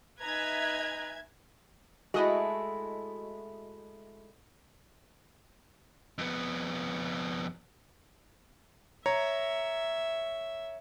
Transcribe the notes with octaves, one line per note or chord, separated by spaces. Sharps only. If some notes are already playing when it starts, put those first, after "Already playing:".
D#4 B4 E5 G#5 A#5 G#6
G#3 A3 E4 F#4 D#5
F2 B3
C#5 E5 A#5